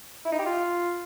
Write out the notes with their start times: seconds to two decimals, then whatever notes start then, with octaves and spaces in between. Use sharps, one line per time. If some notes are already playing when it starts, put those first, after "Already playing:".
0.25 E4
0.32 D#4
0.39 G4
0.46 F4